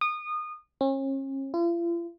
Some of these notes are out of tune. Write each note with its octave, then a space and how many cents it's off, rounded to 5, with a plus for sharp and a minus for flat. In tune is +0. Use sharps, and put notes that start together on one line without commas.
D#6 -25
C#4 -40
F4 -45